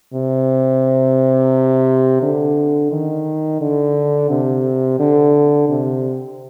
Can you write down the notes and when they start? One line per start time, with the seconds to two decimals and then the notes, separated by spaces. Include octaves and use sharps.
0.14 C3
2.22 D3
2.92 D#3
3.61 D3
4.30 C3
4.99 D3
5.69 C3